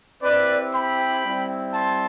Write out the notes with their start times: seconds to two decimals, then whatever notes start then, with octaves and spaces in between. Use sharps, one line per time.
0.22 C4 E4 G4 B4 D5
0.73 G5 B5
1.24 G3 C4 E4
1.74 A5 C6